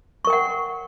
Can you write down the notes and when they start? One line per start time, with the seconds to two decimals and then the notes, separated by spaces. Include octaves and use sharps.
0.25 C#6
0.27 A#4
0.30 G5
0.33 F#5